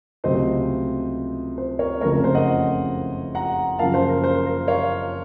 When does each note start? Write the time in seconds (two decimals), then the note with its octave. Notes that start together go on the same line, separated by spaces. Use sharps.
0.24 C#2 C3 F#3 A3 C5 D#5
1.58 C5
1.79 A#4 C#5
2.01 F#1 F2 C#3 A3 A#4 C#5
2.13 A#4
2.24 C5
2.35 D#5 F#5
3.35 F#5 A#5
3.79 F#2 C#3 F3 A#3 F5 A5
3.94 C5
4.09 A#4
4.24 C5
4.46 A#4
4.68 C#5 F5